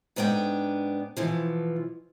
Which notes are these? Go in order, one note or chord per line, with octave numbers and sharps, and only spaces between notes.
G#2 B3 D4 C5 G5
B2 E3 F3